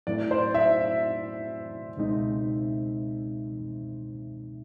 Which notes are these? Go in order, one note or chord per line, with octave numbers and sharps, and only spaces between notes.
A2 F#3 A3 C4 E4 D5
C5
E5
C#2 B2 G#3 C4 D#4